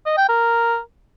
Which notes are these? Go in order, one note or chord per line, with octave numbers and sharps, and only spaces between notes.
D#5
G5
A#4